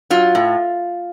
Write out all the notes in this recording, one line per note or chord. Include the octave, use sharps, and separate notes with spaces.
F#3 F4
A2